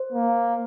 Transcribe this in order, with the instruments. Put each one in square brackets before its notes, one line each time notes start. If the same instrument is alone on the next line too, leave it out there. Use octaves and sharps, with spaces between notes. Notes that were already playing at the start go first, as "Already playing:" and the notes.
Already playing: [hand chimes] C5
[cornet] A#3